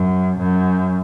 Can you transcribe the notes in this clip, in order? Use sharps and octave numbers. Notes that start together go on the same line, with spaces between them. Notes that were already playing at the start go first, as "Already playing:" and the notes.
Already playing: F#2
F#2